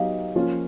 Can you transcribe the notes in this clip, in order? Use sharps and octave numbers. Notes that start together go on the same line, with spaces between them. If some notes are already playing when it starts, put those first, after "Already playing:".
Already playing: F#3 B3 D#4 G4 F5
F3 A#3 C#4 F4